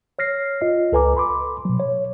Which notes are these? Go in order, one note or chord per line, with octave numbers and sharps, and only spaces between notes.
C#5 F6 A#6 C7
F4 D#5
C#2 A4 B4 G#5 A#5 D6
B5 C6 D6
B2 F#3
C#5